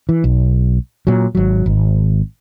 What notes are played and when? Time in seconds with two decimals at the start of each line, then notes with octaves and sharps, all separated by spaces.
0.09 E3
0.24 B1
1.07 A#2 F#3
1.35 G#1 F#3
1.66 G#1